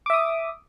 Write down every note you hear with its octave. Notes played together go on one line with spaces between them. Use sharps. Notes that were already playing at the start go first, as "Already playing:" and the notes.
E5 D6 D#6